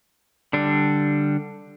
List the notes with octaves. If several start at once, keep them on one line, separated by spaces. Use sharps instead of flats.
D3 G3 D4